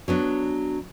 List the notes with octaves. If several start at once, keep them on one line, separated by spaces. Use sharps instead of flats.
F#3 B3 D4